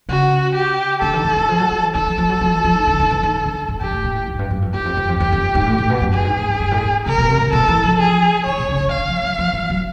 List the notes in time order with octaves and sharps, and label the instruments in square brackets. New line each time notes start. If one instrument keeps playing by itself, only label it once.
[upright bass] C#3 [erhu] F#4
[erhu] G4
[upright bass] D3 [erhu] A4
[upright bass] D#3
D#3
E3
F3
F#3
F3
E3
[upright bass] D#3 [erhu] A4
[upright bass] F3
F3
F#3
F3
E3
F3
D#3
D3
D#3
E3
D#3
D3
D3
G#2
[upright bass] F2 [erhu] G4
[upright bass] A2
A#2
A2
G#2
F#2
G2
F#2
F2
[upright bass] E2 [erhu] G4
[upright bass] F2
E2
F2
[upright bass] E2 [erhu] G4
[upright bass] F2
G#2
A2
A2
B2
F#2
[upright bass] G2 [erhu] G#4
[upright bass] G#2
A2
G#2
G2
A2
A#2
[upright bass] C3 [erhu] A#4
[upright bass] B2
C3
C3
[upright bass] B2 [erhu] A4
[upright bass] E3
F3
[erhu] G#4
[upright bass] D#3 [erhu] C#5
[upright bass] B2
C#3
C#3
[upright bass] D3 [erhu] F5
[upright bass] F3
F#3
F3
E3
F#3